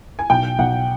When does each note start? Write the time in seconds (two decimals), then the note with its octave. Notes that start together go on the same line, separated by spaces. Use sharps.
0.19 G#5
0.30 B1 G5
0.59 B1 F#5